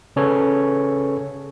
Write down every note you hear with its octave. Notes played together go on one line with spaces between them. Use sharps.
C#3 C#4 G#4 A4 B4 C#5